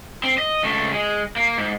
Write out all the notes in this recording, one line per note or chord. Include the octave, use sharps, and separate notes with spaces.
C4
D#5
C#2 A3
G#3
A#3
G#2